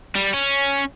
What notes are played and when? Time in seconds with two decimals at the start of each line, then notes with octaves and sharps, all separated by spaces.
0.15 G3
0.34 C#4